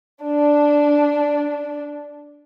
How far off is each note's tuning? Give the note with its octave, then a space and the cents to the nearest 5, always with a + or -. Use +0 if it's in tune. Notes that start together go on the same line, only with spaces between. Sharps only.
D4 -5